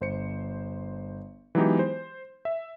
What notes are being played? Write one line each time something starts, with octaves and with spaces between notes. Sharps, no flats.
G1 C5 C#7
E3 F#3 G#3 B3 D#4 G4
C5
E5